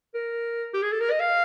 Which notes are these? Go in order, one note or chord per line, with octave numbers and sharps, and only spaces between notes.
A#4
G4
G#4
A4
A#4
D#5
F5